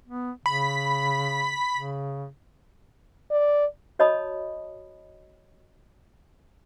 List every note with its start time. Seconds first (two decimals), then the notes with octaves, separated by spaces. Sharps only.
0.08 B3
0.46 C#3 B5
1.75 C#3
3.31 D5
3.99 F#4 C#5 D#5 A5 B5 D#6